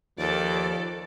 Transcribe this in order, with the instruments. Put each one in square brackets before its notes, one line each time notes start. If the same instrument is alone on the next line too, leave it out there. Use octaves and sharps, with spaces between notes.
[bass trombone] D#2 [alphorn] F3 [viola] A4 D5